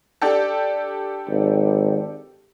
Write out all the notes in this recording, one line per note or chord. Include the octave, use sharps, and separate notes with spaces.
D4 G4 A4
G#1